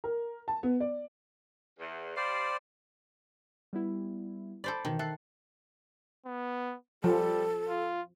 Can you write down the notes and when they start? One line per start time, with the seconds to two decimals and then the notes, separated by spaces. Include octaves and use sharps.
0.04 A#4
0.48 A5
0.63 B3
0.80 D5
1.79 E2
2.17 G3 G4 C5 D5 F5
3.73 G3 B3 E4
4.64 A4 C5 D5 B5
4.85 B2 D#3 E3
4.99 A4 E5 F#6 C7
6.26 B3
7.04 F3 G3 A4
7.69 F4